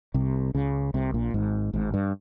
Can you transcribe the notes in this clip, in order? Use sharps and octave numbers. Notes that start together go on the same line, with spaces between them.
C2 C3
C#2 C#3
C2 C3
A#1 A#2
G#1 G#2
G#1 G#2
G2